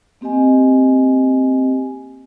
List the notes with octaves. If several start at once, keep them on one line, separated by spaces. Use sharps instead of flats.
A#3 C4 G4 D#5 G#5